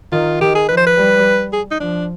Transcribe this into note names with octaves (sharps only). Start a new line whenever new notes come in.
D#3 F4
D#3 G4
G#4
F3 B4
C5
B4
G3
G#4
D#4
F3 D4